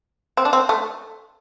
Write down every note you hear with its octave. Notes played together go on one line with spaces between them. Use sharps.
C4
D4
C4
A3